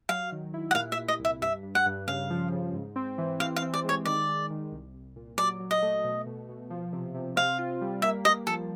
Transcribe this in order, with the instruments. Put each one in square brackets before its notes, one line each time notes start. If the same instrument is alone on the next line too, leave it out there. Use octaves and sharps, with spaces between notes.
[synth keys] F#3 [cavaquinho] F5
[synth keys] D#3
E4
[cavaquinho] F#5
[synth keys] A#2 [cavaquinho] F5
[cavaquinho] E5
[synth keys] A#2
[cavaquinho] D#5
[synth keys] C2
[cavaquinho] E5
[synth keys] G2 [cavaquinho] E5
[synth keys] G2
[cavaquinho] F#5
[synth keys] G2
[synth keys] C#3 [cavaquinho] F5
[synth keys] F3
C#3
G#2
C4
E3
[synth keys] C4 [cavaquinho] F5
[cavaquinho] F5
[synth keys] C4
[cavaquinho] D5
[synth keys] G#3
[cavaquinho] C#5
[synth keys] D#3 [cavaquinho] D5
[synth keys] G#3
D#3
C2
C2
A#2
[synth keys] F#3 [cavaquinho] D5
[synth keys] F#3
[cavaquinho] D#5
[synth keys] A3
B2
B2
B2
F3
C3
C3
[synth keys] C4 [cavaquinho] F5
[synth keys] F4
G3
[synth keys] A#3 [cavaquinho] E5
[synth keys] A#3 [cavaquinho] D#5
[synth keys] F3 [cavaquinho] A4